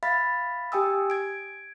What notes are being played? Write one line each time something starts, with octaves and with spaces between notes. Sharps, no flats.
E5 F5 B5 A6 B6
G4 G5 G#5 D#6 E6
G#6 D7